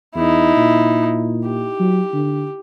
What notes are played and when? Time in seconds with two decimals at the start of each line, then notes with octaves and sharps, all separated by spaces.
0.15 E2 D#4 E4
0.56 A#2
1.46 G4
1.79 F#3
2.13 D3